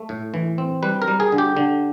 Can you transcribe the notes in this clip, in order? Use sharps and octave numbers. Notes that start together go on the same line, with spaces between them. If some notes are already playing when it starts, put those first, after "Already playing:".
Already playing: A3
A2
E3
C4
G3 B4
A#4
G3
G#4
D3
G4
D3